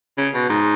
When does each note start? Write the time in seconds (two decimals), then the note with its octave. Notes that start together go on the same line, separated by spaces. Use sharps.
0.18 C#3
0.34 B2
0.50 G#2